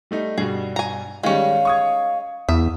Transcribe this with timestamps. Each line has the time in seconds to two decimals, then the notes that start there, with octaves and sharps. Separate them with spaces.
0.11 G3 A3 D#4
0.38 G2 B2 G3 G#4
0.76 G#5 A#5
1.23 D#3 G3 G#3 C#4 F5
1.65 C#6 D#6 G#6
2.49 E2 E5 D#6